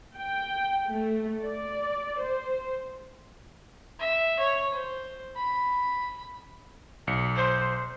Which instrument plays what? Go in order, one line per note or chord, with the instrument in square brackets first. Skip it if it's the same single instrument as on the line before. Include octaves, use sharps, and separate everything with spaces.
[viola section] G5
A3
D5
C5
[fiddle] E5
C#5
C5
B5
[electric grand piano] B1 C#7
[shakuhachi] C5